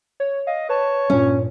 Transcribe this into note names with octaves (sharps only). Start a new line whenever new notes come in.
C#5
D#5 F5
B4 C#5 A5
G2 A#2 C#4